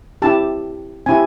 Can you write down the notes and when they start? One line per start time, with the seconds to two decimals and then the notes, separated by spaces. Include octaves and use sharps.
0.22 C4 E4 G4 A5
1.06 C4 E4 G4 G#5